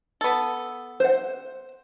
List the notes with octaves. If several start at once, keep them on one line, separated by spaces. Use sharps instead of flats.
B3 A4
C5 F#5